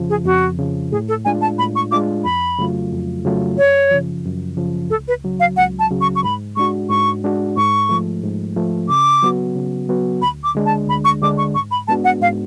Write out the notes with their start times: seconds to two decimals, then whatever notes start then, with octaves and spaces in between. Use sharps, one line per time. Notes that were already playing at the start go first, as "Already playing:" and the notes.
Already playing: F2 C#3 F3
0.10 G#4
0.25 F2 F#4
0.59 C#3 F3
0.92 A2 G#4
1.08 A4
1.25 G#3 D4 F4 G#5
1.41 A5
1.59 A2 B5
1.76 C#6
1.91 G#3 D4 F4 D6
2.24 F2 B5
2.59 C#3 F#3 A3 F4
2.92 F2
3.25 C#3 F#3 A3 F4
3.57 F#2 C#5
3.91 C#3 F3
4.25 F#2
4.57 C#3 F3
4.90 C#2 A4
5.08 B4
5.24 C#3 F#3
5.40 F5
5.57 C#2 F#5
5.79 A5
5.91 C#3 F#3
6.01 C#6
6.16 C#6
6.24 G#2 B5
6.56 G#3 D4 F#4 C#6
6.90 G#2 C#6
7.24 G#3 D4 F#4
7.57 G#2 C#6
7.89 F3 A3
8.23 G#2
8.56 F3 A3
8.89 C#3 D6
9.23 F#3 B3 F#4
9.56 C#3
9.89 F#3 B3 F#4
10.22 D2 B5
10.44 D6
10.55 D3 G#3 D4
10.66 A5
10.88 D2 B5
11.05 C#6
11.22 D3 G#3 D4 D6
11.38 C#6
11.55 G#2 C#6
11.71 B5
11.88 G#3 B3 D4 F#4 A5
12.04 F#5
12.21 G#2 F5